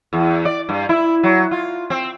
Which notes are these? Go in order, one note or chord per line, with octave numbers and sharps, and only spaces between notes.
E2
D5
G2
E4
F#3
F4
C4